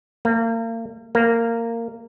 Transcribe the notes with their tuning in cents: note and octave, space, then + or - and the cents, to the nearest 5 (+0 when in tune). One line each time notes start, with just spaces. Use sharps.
A#3 -35
A#3 -15